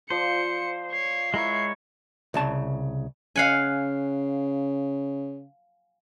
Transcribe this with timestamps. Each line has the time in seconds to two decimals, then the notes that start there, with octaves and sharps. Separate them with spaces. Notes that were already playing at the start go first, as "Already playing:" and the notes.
0.10 F3 C5 D5 C#7
0.93 C#5 C7
1.34 G#3 E4 A#4 C#5 E5
2.34 C2 C#3 A5
3.36 C#3 F5 F#5 G#5